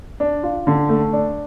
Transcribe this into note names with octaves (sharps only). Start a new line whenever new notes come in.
D4
F4
D3
A3
D4